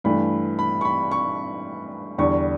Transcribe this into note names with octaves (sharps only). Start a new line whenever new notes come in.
G2 E3 A3 B5
B5
C#6
B5
C#6
E2 D3 G3 C#6